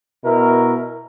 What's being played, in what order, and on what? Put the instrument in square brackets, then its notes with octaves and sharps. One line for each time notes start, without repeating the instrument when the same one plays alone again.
[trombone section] B2 E4 A#4